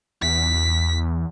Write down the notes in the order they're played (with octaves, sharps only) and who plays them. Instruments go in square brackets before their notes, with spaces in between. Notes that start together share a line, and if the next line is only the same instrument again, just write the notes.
[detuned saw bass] E2 [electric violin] B6